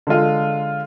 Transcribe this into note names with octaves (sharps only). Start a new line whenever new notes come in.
D3 G#3 F4